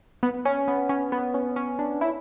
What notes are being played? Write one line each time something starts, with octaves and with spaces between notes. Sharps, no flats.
B3
C#4
B3
C#4
B3
C#4
C#4
D4
E4